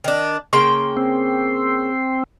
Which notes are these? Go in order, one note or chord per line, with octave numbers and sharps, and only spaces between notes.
D#3 D4
C#3 A#3 G5 C6
C4